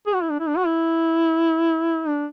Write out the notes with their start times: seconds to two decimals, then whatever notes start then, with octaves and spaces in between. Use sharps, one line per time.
0.07 G#4
0.14 F#4
0.23 E4
0.31 D4
0.40 E4
0.48 D4
0.57 F#4
0.67 E4
2.07 D4